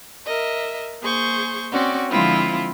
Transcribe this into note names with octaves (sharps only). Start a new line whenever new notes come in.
A#4 D#5 E5
A#3 G#4 C5 C#6 G6
C4 C#4 F#4 D5
D3 F3 G#3 C4 E4 F4